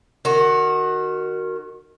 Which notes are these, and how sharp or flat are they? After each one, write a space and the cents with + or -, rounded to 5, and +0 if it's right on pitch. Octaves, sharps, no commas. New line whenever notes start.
D#3 -15 F#4 +10